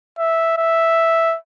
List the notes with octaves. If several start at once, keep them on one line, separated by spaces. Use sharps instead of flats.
E5
E5